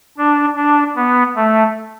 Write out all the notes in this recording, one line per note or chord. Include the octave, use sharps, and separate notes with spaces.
D4
D4
B3
A3